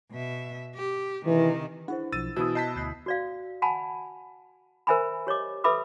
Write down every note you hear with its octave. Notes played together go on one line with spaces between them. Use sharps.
B2 E5
G4
C3 D#3 E3
D4 E4 C5 F#5
B1 F3 E6 A6 D#7
B2 E3 E4 F#4 D#6 E6
D#5 A5 F#6 G6 B6 C7
D2 F#6 G6 C7
F#4 D5 F5
F#5 G#5 A5 B5
A#4 C5 E5 G#5 A#5 B5
G4 C#5 D#5 D6
A4 B4 E5 B5 D6 E6